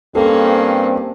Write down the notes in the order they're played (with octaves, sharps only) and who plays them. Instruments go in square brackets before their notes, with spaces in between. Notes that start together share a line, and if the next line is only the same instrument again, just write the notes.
[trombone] G2 [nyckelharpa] A#3 C#4 [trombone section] C4 [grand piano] A4